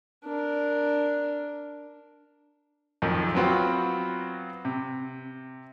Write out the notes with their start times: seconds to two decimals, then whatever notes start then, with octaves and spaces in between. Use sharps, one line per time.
0.24 D4 A#4
3.02 B1 F2 D#3 F3
3.35 F#3 B3 C4 F4 F#4
4.65 C3